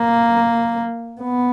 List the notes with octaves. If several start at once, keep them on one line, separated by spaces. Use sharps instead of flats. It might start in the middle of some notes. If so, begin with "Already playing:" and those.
Already playing: A#3
B3